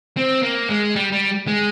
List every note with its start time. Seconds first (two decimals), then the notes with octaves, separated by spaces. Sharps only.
0.17 C4
0.43 A#3
0.69 G#3
0.96 G3
1.12 G3
1.47 G#3